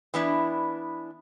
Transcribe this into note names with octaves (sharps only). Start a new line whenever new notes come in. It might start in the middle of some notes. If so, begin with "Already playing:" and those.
E3 B3 D4 E4